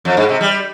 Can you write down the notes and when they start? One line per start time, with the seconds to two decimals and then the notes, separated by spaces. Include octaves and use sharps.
0.05 F2
0.17 G#2
0.29 C3
0.41 G3